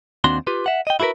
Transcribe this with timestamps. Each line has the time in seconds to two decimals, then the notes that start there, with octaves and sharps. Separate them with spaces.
0.24 D#2 C4 D4 F#4 C6
0.47 F4 G4 B4
0.66 E5 F#5
0.87 D#5 G5
1.00 E4 F#4 G#4 A#4 B4